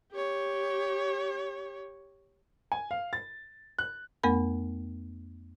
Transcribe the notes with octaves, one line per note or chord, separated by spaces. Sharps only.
G4 C#5
G#5
F5
A6
F#6
F2 A3 B3 A#4 B5